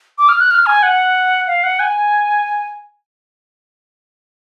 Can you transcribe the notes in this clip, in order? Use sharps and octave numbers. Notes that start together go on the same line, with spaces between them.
D6
F6
F#6
F6
G#5
F#5
F5
F#5
G#5